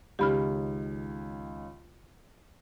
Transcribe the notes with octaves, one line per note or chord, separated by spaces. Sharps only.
C#2 D#3 C#4 G4 B5 F6